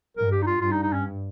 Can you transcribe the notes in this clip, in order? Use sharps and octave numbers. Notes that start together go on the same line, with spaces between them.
G2 A#4
G4
D#4
F4
G2 F4
D#4
D#4
C#4